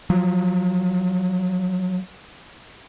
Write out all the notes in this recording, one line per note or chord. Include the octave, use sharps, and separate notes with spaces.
F3 F#3